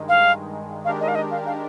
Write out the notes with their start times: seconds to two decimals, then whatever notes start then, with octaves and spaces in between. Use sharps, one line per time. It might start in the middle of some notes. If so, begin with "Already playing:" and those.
Already playing: G2 D#3 G#3
0.09 F5
0.85 D#3 G#3 D4 G4 A#4 F5
1.01 D#5
1.08 F5
1.15 D#5
1.31 F5
1.46 F5